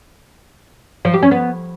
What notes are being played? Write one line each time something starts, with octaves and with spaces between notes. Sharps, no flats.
F3
G4
C#4
B3